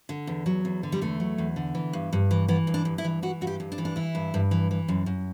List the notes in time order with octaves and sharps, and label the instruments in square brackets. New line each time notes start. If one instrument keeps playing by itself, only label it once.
[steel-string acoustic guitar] D3
E2
F#3
E2
D3
G3
E2 A3
F#3
E2
D3
E3
G2
G2
E3
E3 B3
G2
D4
G2
E4
E3
E3 F#4
G2 F#4
G4
G2
D4
E3
D4
E3 E4
G2
G2
E3
E3
F#2
F#2